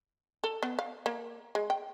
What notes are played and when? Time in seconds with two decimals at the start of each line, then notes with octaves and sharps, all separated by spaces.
0.44 A4
0.63 B3
0.79 F5
1.06 A#3
1.55 G#3
1.70 G5